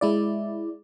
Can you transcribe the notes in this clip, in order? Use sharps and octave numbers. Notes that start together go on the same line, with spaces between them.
G#3 E4 D5